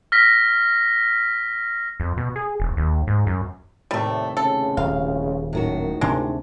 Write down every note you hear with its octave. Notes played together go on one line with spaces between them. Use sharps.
F6 A#6 B6
F2
B2
G#4
E1
D#2
G#2
F#2
D#2 A2 C3 G3 A3
C#3 A4
D#1 F5
F#2 A2 D#3 F#4
G#1 D2 C3 G#3 D4